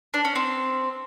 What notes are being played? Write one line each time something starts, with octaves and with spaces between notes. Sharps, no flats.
D4
C#4
C4